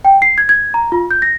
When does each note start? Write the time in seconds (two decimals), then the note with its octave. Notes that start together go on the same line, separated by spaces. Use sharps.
0.05 G5
0.22 C7
0.38 G#6
0.49 G#6
0.74 A#5
0.92 F4
1.11 G6
1.22 A#6